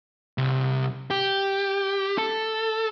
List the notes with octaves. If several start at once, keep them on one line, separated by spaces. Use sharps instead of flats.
C2
G4
A4